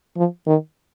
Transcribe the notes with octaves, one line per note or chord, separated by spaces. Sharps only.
F3
D#3